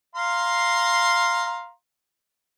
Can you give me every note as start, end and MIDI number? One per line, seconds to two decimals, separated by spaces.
0.15 1.70 77
0.15 1.70 82
0.15 1.70 84